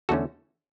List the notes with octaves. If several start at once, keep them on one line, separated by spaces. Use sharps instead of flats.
E2 D3 A3 C#4 F#4 A4